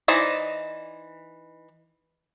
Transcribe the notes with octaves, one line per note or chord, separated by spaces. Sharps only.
E3 D#4 C5 D5 D#5